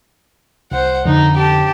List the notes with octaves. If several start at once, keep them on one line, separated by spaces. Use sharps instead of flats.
C2 C5 F#5
F2 D3 D#4
G4 A5